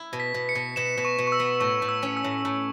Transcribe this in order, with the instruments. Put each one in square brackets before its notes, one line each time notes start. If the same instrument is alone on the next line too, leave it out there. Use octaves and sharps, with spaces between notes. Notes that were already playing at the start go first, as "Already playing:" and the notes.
Already playing: [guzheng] E4
B2
[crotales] B6
[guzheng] B2
[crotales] C#7
[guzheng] B2
[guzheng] B2 [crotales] E7
[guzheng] B2
[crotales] C#6
[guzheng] B2
[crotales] C#6
E6
[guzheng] B3
[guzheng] A2 [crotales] C#6
[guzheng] A2
[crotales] E6
[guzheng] C#4
[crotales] E6
[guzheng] A2
A2